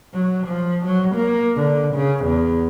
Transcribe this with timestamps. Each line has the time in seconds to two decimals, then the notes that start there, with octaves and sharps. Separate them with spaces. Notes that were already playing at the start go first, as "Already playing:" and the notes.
0.13 F#3
0.47 F3
0.85 F#3
1.15 A#3
1.56 D3
1.95 C#3
2.25 E2